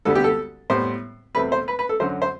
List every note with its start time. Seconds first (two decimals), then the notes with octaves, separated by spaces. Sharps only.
0.05 D2 D3 G3 B3 A4
0.15 G4
0.24 A4
0.70 A2 G3 B3 C5
1.35 E2 B2 A3 C4 B4
1.52 C5
1.68 B4
1.79 B4
1.89 A4
2.00 F#2 D3 F#3 C5
2.22 C5